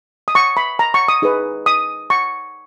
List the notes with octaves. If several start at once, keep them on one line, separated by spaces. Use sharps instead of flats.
D#6
C#6
B5
A#5
C#6
D#6
D#4 G#4 B4
D#6
C#6